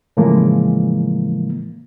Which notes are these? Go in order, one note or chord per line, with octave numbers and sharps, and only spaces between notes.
A2 C#3 E3 F3 G#3 A#3